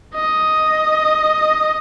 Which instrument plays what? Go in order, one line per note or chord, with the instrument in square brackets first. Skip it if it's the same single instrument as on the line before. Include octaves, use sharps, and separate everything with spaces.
[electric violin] D#5